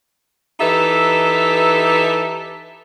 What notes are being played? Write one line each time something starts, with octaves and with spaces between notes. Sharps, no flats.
E3 D#4 G4 A4 B4 E5